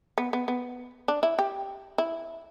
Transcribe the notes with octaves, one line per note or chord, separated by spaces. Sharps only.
B3
B3
B3
D4
E4
G4
E4